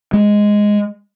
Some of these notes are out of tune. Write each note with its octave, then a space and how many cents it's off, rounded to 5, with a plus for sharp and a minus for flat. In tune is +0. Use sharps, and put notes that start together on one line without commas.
G#3 +0